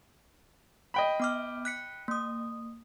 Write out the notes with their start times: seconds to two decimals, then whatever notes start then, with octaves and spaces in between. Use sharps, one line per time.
0.94 D#5 G5 B5
1.20 B3 D6 F6
1.65 F#6 B6 C#7
2.08 A#3 D#6